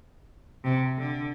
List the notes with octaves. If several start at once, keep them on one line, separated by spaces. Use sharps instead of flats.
C3
D3